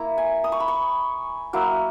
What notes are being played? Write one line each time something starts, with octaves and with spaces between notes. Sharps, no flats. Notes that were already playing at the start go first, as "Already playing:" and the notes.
Already playing: A#3 E4 A#5
G#5
D#6
C#6
B5
C#6
F#3 A#3 E4